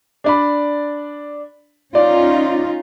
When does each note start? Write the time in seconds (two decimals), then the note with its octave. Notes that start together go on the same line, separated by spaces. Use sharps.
0.24 D4 D5 B5
1.95 C#4 D#4 F4 D5